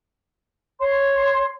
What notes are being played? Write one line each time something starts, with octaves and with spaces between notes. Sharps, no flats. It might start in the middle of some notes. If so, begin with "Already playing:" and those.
C#5 C6